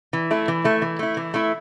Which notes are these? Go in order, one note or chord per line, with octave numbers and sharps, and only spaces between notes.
E3
A3 E4
E3
A3 E4
E3
A3 E4
E3
A3 E4